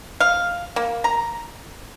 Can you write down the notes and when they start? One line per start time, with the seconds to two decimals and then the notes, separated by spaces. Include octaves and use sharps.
0.20 F5
0.76 A#3
1.04 A#5